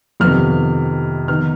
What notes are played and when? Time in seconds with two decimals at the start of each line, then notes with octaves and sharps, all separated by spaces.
0.20 F2 C3 D#3 B3 F6
1.28 D#3 B3 D#4 F6